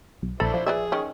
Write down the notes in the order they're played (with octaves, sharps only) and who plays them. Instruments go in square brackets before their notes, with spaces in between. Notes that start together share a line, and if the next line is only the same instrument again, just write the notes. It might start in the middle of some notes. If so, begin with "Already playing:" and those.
[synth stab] B1
[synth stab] A#1 A4 [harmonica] D4 E4 C5 [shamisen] B5
[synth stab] F3
[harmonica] G#4 [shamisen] B4 D5 E5
[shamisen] D#3 C#4